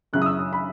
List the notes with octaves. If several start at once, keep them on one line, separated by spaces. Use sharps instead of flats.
F#2 C#3 F#3 C#4 E4 F#6
D#6
E6
D#6
B5